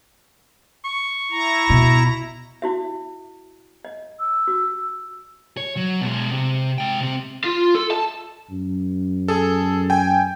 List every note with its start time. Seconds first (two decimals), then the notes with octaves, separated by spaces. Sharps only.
0.85 C#6
1.31 E4 A#5
1.70 B2
2.62 E4 F#4 E5
3.85 D#5
4.20 E6
4.48 F#4
5.57 C#5
5.77 F#3
6.01 B2 G#3
6.31 C3
6.78 G#3 G5
7.00 C3 C4
7.44 F4
7.75 A4
7.91 A5
8.51 F#2
9.28 G#4 A4
9.90 G5 G#5